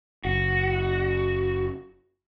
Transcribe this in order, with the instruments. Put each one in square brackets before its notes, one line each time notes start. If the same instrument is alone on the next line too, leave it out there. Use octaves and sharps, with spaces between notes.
[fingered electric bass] F#1 [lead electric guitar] F#4